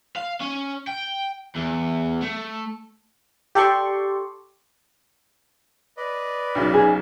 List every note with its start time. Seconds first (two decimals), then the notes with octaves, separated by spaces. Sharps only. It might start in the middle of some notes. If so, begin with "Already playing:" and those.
0.16 F5
0.40 C#4
0.87 G5
1.56 E2
2.22 A3
3.55 G4 A4 D5 C6 C#6
5.97 B4 D5 D#5
6.55 B1 C#3 F#3
6.74 G#4